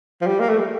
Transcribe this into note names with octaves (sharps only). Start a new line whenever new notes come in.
F3
G3
A#3
A3
G3